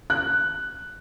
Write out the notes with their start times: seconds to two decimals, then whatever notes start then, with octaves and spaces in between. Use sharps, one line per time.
0.10 F#6